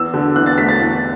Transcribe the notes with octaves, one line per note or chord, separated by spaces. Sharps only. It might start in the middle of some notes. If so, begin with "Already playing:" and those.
Already playing: E2 E6
D3
E2 F#6
A6
A3 B6
A6
E2